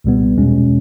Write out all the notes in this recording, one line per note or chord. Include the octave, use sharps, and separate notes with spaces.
C2 A#2 G3 B3
E2 B2 G#3 C#4